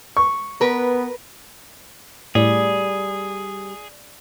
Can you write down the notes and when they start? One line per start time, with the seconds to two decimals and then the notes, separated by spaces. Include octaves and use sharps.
0.17 C#6
0.61 B3 A#4 B4
2.35 A2 G3 G#4